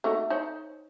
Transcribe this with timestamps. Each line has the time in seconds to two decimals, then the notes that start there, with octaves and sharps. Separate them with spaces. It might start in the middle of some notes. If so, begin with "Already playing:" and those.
0.04 A3 D#4 F#4
0.30 D#4 C5 C#5